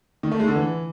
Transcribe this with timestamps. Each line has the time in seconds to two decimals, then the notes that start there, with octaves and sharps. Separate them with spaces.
0.23 D#3
0.31 A3
0.40 G#3
0.48 D3
0.56 E3